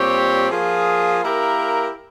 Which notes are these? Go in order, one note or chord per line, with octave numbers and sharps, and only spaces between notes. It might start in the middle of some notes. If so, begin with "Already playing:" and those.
Already playing: A#2 G3 C4 G4 C#5
F3 A#3 F4 G#4
A#3 E4 G4 A#4